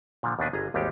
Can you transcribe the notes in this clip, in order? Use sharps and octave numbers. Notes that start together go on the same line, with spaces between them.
A#2 D3 F3
D#2 B2 D#3 D4 B4 G#5
G1 G#4 D#5 A#5
G#1 D#2 G3 G#3 G4